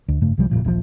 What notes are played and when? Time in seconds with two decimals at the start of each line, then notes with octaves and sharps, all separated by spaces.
0.08 D2
0.21 F1 G2 C#3 A3
0.38 C2 C3 F3 G3
0.50 F1 A#1 A#2 F3
0.65 D#1 A#1 C3 F3